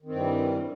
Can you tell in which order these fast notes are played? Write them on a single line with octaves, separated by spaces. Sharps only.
D#3 C4 G2 E3 G3